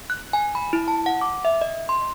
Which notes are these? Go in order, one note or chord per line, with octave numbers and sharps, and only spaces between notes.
F#6
G#5
B5
E4
A5
F#5
D6
E5
D#5
C6